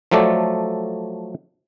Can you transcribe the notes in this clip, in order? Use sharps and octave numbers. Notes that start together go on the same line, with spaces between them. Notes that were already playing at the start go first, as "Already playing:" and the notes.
F3 F#3 A3 A4 D5